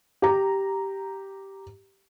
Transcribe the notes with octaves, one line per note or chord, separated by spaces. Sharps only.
G4 A#5